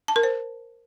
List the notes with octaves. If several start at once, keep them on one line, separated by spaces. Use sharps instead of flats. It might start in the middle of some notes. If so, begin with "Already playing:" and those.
A5
A#4
C5